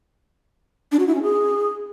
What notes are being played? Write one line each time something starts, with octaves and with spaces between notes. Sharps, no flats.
D4
F#4
E4
C#4
G#4